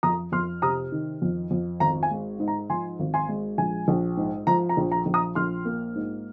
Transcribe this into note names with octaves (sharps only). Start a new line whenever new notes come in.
F2 A#5 D#6
F2 C6 F6
C3 A#5 D#6
D#3
F2
F2
G#1 A#5
G#5
G#3
G#2
A#5
F3 G#5 C6
G#1
G#5 C6
G#3
A#1 G#5
A#1
G#2
F3 A#5
A#5
A#1
A#5
A#1
A#5 D#6
A#1 C6 F6
A#3
G#2